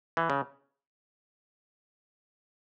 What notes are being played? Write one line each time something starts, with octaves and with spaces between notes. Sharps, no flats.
E3
C#3